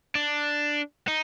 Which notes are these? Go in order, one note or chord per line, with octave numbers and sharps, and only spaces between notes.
D4
D#4